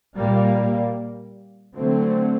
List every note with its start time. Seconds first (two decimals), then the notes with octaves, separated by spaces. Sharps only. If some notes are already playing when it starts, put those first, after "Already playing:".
0.16 A#2 G3 A#3
1.75 D3 F#3 A3 C4